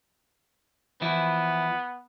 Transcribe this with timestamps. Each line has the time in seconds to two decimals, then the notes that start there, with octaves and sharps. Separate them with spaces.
1.02 E3 F3 B3 E4